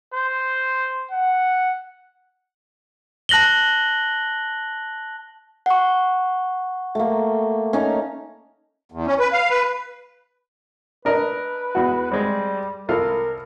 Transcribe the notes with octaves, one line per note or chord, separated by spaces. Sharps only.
C5
F#5
A5 F#6 A#6 F#7 G7
F#5 C#6
A3 A#3
C#4 D#4
E2
C#4
B4
F5
B4
D4 A#4 B4 D#5
E2 F#4
G3 G#3 C4
C2 F4 A4 A#4